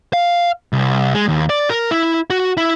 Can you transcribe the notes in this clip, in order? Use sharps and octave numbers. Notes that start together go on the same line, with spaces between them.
F5
C2
G#3
D#2
D5
A#4
E4
F#4
E4